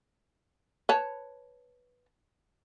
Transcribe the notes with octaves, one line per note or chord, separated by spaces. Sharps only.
B4 C#5 A5